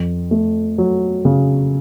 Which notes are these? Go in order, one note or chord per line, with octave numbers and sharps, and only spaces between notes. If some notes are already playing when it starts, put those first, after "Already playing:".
Already playing: F2
A3
F#3
C#3